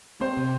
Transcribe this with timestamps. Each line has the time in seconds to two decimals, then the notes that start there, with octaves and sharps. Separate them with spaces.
0.21 C4 C5 C6
0.37 C3